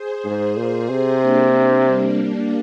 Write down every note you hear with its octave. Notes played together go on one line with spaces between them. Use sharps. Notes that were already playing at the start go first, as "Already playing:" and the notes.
Already playing: G#4 C5
G#2
A#2 G#4 C5
C3
A#3 D4
G3 A#3